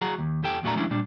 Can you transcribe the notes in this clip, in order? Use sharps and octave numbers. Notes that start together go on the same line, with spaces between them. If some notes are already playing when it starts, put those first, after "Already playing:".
F#3 F#4 G#4 A#5
D#2
E2 G4 A4 G5
E2 A#2 F#3 A3 D4 A#5
E3 F3 G#3 C#4 D4 E4
A#2 G3 D4